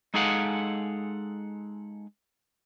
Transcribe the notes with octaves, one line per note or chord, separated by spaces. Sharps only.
G#3 D#4 G#4 A4 F5 F#5